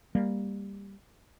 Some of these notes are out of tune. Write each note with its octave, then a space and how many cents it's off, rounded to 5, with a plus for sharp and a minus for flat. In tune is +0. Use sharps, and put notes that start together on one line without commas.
G3 +15 A#3 +0